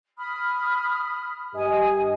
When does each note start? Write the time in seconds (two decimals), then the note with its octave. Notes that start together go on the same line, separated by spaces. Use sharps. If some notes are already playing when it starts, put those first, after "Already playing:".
0.18 B5 D#6 F6
1.54 G2 G4 D#5 G#5 D#6